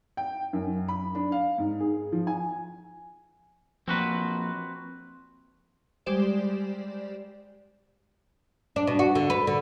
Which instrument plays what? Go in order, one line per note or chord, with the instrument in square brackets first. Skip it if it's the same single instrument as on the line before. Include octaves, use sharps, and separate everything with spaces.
[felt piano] G5
F#2
B5
D4
F5
G#2
G#4
F3
G#5
[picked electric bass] F3 A#3 [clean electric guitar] C4 F#4 B4
[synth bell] G3 G#3 G4 C5 D5 E7
[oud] D4
B2
F#4
D3
B4
D3